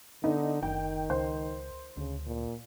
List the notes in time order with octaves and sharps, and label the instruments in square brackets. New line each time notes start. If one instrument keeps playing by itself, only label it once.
[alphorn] D3 [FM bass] B3 [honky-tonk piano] D#4
[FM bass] F#1 [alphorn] D#3 [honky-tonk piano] G5
[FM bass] C#2 [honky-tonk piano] C5
[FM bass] D2 [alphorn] C#3
[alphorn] A#2